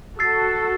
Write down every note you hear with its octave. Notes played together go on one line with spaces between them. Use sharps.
F#4 A4 E6 A6 C7